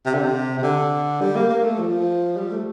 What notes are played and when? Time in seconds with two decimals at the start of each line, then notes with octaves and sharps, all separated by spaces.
0.06 C3
0.14 D3
0.22 C3
0.58 C3
0.63 D3
1.21 G3
1.35 A#3
1.50 A#3
1.64 A3
1.79 F3
2.37 G3
2.52 A3